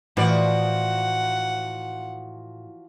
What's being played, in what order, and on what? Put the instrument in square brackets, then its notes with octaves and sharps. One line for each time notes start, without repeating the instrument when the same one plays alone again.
[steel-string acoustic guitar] A2 [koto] E3 [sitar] F3 F#4 D5 [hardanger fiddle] F#5